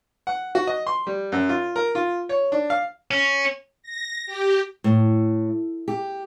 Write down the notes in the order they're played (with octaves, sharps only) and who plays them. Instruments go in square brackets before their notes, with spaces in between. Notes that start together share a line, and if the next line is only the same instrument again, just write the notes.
[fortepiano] F#5
F#4
D#5
C6
G3
F#2
F4
A#4
F4
C#5
D4
F5
[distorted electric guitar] C#4
[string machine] A#6
G4
[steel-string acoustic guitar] A2
G4